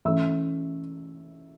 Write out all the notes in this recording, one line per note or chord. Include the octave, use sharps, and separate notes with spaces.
E3 A3 C#4 E5 E6